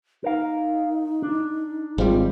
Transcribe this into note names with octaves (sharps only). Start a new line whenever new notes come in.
D#4 A#4 F5
D4
G#1 G3 G#3 C4 F4